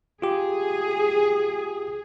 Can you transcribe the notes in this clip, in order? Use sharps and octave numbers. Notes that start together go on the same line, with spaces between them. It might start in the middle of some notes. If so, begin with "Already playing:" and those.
F4 G4 G#4